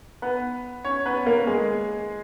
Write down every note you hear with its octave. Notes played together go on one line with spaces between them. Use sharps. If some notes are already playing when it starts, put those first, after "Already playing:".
B3 B4
C#4 C#5
B3 B4
A#3 A#4
G#3 G#4